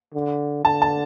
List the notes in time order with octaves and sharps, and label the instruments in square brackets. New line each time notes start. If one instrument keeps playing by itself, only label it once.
[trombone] D3
[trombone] D3 [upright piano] A5
[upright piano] A5